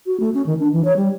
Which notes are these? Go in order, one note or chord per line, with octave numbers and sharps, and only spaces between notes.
F#4
A3
C#4
D#3
D4
E3
C#5
G3